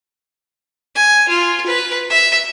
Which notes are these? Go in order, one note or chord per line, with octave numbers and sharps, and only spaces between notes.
G#5
F4
B4
E5